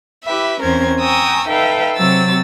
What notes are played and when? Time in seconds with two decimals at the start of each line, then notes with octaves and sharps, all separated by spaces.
0.25 E4 G4 B4 E5
0.61 E2 C4 C#4 A#4 C5 G#6
0.99 G5 G#5 A#5 C#6 D#6 E6
1.48 D#4 A4 B4 E5 F5 G5
1.96 C3 F#3 C4 E6 A6